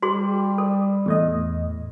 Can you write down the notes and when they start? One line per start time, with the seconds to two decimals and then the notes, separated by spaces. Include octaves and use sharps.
0.02 G3 F#4 G#4 C6
0.58 A4
1.06 E2 A2 D#5